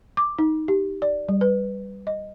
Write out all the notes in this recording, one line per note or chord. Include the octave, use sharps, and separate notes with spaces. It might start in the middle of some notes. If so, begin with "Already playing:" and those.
D6
D#4
G4
D5
G3
B4
D#5